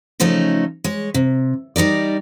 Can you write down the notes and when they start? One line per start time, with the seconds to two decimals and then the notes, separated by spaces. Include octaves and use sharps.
0.20 C#3 F3 A3 C#4 D#4
0.84 G#3 C#5
1.14 C3
1.76 G3 D#4 A#4 D5